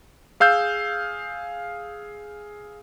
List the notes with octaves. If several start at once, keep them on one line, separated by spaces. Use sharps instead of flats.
G#4 F5 E6 G6